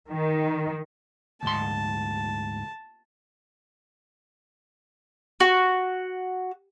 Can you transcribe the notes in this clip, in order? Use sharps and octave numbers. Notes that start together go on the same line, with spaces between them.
D#3
D2 G#2 A5 C6
F#4